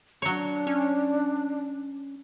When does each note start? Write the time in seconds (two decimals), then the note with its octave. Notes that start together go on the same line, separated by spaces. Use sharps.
0.22 F#3 D4 C#5
0.67 C#4